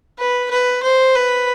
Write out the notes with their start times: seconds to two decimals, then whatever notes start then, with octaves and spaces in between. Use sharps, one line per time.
0.19 B4
0.51 B4
0.83 C5
1.15 B4